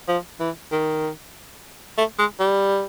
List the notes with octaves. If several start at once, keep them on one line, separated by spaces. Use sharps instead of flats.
F3
E3
D#3
A3
G#3
G3